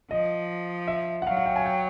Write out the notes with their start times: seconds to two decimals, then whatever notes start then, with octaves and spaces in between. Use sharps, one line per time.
0.11 F3 D#5
0.88 E5
1.22 F#5
1.27 F#3 F5
1.37 F#5
1.46 G5
1.56 G#5
1.66 G5